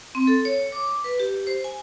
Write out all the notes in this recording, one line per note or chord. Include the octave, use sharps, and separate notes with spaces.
C4
A4
C#5
D6
B4
G4
C5
G#5